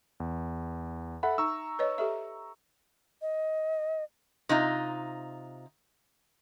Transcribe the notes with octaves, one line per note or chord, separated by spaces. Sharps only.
E2
A4 E5 F#5 B5
D#4 A#5 C#6 E6
B4 C#5 D#5
G4 A4 E5
D#5
C3 D#4 F4